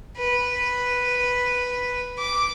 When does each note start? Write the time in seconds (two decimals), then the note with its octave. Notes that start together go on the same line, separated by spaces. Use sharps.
0.17 B4
2.18 D6